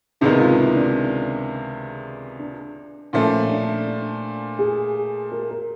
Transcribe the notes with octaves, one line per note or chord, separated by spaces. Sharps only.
C#2 C3 D#3 G#3 B3 D4
F4
E4
D4
D4
A#2 F3 A3 C#4
D4
D4
G#4
A#4
A#4